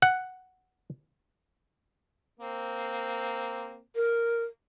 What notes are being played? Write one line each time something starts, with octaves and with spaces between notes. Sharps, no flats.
F#5
A#3 C4
A#4